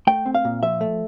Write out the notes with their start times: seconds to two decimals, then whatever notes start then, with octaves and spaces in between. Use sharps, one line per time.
0.07 A3 G5
0.26 C4
0.35 F5
0.45 A#2
0.63 F3 E5
0.81 A3